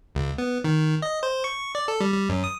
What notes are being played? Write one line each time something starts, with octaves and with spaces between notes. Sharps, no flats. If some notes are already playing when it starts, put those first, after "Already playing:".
C#2
B3
D#3
D#5
C5
C#6
D5
A4
G3
G3
F#2
D#6